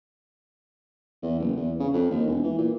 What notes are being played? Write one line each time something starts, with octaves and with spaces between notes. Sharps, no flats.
E2
F#1
E2
C#3
F2
D#2
E1
E3
A#2